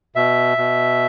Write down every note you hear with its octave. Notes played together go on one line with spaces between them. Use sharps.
B2 E5
B2